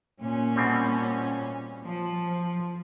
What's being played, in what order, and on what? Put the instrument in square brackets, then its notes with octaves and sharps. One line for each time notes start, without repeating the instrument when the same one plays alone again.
[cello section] A#2 C#4
[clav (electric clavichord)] B2 G3 C4
[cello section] F3